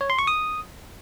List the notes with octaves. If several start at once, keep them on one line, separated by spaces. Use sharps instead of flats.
C#5
C6
C#6
D#6